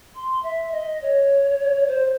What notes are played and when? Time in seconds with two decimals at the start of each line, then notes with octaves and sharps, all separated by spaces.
0.15 C6
0.43 E5
0.72 D#5
1.02 C#5
1.87 C5